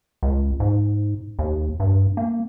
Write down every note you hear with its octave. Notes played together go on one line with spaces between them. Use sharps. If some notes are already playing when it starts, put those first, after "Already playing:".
C#2
G#2
D#2
G2
A#3